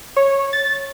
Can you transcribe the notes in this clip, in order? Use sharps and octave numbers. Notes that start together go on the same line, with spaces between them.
C#5
A6